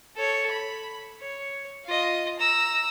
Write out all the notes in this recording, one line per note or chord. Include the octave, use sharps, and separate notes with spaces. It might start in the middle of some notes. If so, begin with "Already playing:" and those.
A4 C#5
B5
C#5
F4 D#5
A#5 E6